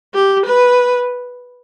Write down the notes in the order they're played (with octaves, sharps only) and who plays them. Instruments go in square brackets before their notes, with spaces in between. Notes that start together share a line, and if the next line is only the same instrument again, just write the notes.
[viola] G4
B4